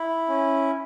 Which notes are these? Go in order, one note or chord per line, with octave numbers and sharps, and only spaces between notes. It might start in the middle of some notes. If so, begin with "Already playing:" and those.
Already playing: E4
C#4